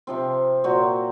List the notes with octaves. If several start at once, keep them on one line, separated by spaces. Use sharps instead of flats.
C3 F3 C4
A#2 F#3 F#4 C5